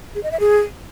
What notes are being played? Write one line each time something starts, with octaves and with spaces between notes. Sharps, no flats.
G#4
D#5
E5
G#4